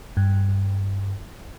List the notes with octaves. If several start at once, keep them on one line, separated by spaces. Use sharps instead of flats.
G2